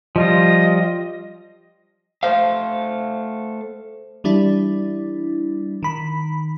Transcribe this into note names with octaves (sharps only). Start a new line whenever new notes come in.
F3 G3 F4 D#5
A3 C5 F5
E3 G3 D4 E4
D#3 B5